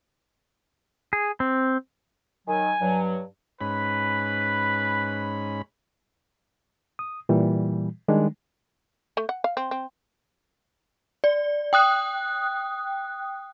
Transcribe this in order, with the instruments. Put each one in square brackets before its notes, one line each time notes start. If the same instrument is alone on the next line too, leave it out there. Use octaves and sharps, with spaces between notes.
[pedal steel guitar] G#4
C4
[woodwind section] D#3 F#3 [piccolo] G#5
[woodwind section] G2 F#3
[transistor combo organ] G#2 C#4 B5 [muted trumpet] B4
[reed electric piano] D#6
A#2 E3 G3
D#3 G3 G#3 D4
[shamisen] A3
F#5
F5
C4
C4
[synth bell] D5
G5 D#6 F#6